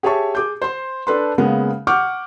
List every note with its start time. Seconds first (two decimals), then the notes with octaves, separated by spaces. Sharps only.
0.03 G4 G#4 C#5 E5 A5 C#6
0.35 G#4 D6 G6
0.62 C5 C6
1.07 D4 A4 B4 C6
1.38 C#3 G#3 A#3 B3
1.87 F#5 C#6 D6 F6 G6